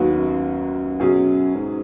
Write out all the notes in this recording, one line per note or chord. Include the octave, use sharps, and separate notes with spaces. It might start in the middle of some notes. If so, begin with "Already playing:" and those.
Already playing: D#2 D#3 F#3 B3 F#4
F#2
B2 F#3 C#4 G#4
G#2